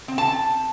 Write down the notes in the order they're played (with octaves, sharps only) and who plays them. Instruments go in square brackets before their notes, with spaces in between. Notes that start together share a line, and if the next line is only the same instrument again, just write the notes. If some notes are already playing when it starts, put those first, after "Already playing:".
[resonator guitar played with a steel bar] C4
A5